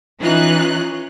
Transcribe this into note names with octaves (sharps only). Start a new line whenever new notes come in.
E3 C#4 D#4 F4 F#6